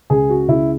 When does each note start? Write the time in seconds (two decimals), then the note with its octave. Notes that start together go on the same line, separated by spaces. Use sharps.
0.10 C#2 G#4
0.29 F#4
0.48 C#2 E4